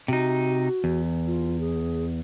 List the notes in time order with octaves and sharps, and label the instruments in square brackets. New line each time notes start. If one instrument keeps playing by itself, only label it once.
[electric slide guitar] C3 D#4 [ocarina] F#4
[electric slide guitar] E2
[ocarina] F4
G#4